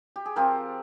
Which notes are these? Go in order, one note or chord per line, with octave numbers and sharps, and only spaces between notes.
G4
G#4
F3 C4 F4 G4 A#4